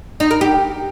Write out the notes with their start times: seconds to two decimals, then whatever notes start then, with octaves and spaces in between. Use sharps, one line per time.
0.20 D#4
0.31 A#4
0.41 G4